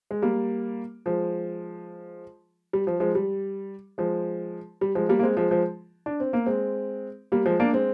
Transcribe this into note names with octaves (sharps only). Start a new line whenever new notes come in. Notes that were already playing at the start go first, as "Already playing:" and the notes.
G#3
G3 A#3
F3 G#3
G3
F3
F3 G#3
G3
F3 G#3
G3
F3 G#3
G3 A#3
A#3
G#3 C4
F3 G#3
F3 G#3
D4
C4
A#3
G#3 C4
G3 A#3
F3 G#3
A#3 D4
G#3 C4